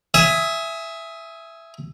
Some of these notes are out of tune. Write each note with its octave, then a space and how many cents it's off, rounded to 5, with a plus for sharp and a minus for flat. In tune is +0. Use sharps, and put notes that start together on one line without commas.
E5 +10 G#5 +0 D#6 +30